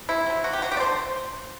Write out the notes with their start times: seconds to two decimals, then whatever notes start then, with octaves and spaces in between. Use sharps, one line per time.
0.09 C3 E4
0.26 F#3 C4
0.44 C3 F#4
0.53 G4
0.62 F#3 C4 F#4
0.72 G4
0.77 D5
0.80 D3 C5